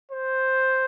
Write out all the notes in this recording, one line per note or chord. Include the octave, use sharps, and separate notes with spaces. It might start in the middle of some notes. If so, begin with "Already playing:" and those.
C5